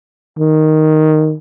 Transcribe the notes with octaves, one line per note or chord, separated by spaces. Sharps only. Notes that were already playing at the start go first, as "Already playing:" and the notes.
D#3